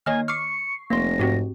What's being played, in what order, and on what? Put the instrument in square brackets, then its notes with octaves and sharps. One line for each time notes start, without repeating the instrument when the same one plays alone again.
[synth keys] D#3 A#3 [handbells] C#5 D#5 F6 [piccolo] G#5
[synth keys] C#6 C7 [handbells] D6 F6 [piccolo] C#7
[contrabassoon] F1 [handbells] A#3 C6 [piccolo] A#6
[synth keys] G#2 [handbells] C4 F#4 G4